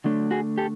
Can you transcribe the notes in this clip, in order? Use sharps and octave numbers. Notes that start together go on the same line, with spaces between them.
D3 F#3 A3 D4
F#4 G#4
G4 A4